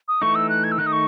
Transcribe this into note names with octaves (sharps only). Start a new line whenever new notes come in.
D#6
E3 A3 D#4 C#6
E6
F#6
G#6
E6
D#3 A3 D#4 F#6
D#6
C#6